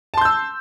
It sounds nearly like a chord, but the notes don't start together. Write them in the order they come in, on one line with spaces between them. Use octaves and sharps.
A5 C6 G6 E6